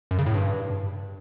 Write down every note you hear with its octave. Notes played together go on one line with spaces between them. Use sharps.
F#2
C#3
A2
G2